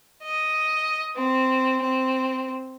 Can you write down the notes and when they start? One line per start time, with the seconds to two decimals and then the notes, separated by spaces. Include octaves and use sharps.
0.23 D#5
1.16 C4
1.81 C4